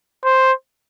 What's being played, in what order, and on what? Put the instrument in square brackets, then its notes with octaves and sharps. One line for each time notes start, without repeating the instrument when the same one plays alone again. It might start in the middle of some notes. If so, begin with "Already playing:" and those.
[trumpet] C5